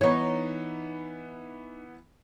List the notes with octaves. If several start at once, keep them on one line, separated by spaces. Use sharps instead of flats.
E3 B3 D#4 C#5